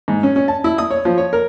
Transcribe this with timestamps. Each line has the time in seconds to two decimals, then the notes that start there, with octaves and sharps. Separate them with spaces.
0.08 G#2
0.23 C#4
0.36 C#4
0.48 A5
0.64 E4
0.78 D#6
0.91 C#5
1.05 F3
1.18 C#5
1.33 A#4